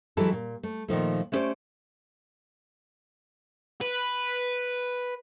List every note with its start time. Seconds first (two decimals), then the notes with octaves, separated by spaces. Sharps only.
0.17 E3 F#3 G#3 E4 G4 A4
0.32 A#2
0.63 A3
0.88 A#2 D#3 F3 A3
1.32 A3 B3 C#4 G4 C5 D5
3.81 B4